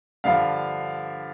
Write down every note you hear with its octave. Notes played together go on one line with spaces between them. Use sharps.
G2 D3 F3 F5